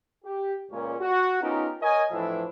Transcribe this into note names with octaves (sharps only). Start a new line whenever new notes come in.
G4
C#2 A#2 C#4
F#4
B3 C#4 D#4 F4 G4 A#4
A#4 C#5 D#5 G#5
F2 A2 E3 F3 D4 E5